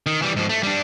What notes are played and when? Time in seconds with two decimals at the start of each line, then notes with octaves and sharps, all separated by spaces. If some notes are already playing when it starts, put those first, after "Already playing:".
0.06 D#3
0.22 E3 G3
0.36 G#2 F3
0.49 A3
0.63 G3 D4